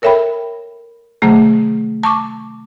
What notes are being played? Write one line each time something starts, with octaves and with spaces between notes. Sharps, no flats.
A4 A#4 C#5 E5 G5 B5
C3 D#3 F#3 A3 G#4 A#5
A5 C#6 D6